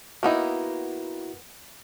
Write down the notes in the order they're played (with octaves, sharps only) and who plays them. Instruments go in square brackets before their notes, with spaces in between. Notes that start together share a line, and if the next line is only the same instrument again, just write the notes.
[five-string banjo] A#3 B3 D#4 [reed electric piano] E4 F#4